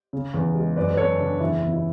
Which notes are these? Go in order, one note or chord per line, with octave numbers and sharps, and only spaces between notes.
C#3
E2
G#3
F#2 B4 D5
B4
F#2 A4 C#5
C#3 D4
E2 E4
E2
E4